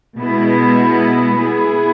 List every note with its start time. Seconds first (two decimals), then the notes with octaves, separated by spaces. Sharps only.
0.18 B2 G#3 B3 E4
1.41 B3 E4 G#4